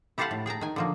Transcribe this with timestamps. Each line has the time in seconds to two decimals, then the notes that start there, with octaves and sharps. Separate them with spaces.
0.18 E4 G4 A4 C5 F5 F#5
0.31 A2
0.46 G#4 G5 A5 A#5
0.61 D#3 G#5
0.76 D3 F3 A#3